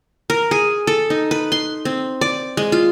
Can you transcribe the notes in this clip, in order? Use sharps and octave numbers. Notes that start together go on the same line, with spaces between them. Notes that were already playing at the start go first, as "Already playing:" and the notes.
A#4
G#4
A4
D#4
B4
C6
C4
D5
G#3
F4